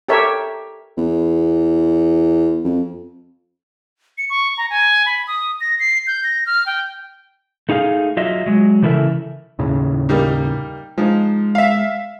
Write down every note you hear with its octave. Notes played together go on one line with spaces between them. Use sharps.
G4 A4 A#4 C#5 E5
E2
F2
C#7
C#6
A#5
G#5
B5
D#6
A#6
C7
G6
A#6
F6
G5
A3 D#4 G#4 F5
F#3 F4 D#5 E5
F#3 G#3
C#3 E3 E4 A4 A#4 E5
D#2 A2 C#3
G3 A#3 D#4
F3 G#3 D#4
E5 F5